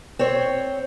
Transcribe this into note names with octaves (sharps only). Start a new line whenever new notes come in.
C4 C#5